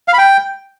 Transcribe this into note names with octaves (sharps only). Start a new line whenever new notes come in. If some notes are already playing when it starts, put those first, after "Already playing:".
F5
B5
G5